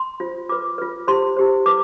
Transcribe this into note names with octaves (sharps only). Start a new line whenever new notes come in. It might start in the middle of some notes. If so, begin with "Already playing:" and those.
Already playing: C6
F4 C5
F4 B4 D6
F4 B4
E4 G4 C5 C6
E4 G4 C5
E4 B4 D6